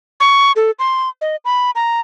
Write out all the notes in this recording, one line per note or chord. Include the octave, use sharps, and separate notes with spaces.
C#6
A4
C6
D#5
B5
A#5